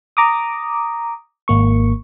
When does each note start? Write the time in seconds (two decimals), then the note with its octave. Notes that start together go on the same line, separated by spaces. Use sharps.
0.17 A#5 D6 D#6
1.48 G#1 A#3 C#6